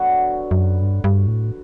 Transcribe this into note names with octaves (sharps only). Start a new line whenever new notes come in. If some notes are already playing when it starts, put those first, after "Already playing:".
Already playing: D3 F#3 B3 F#4
F#2
G2
G2
A2